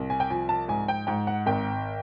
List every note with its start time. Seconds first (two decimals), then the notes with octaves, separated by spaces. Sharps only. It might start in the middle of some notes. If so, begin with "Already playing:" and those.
Already playing: C2
0.10 G#5
0.20 G5
0.30 F3 G#5
0.49 A5
0.68 G#2 G#5
0.88 G5
1.07 G#2 G5
1.27 F#5
1.46 G#1 G5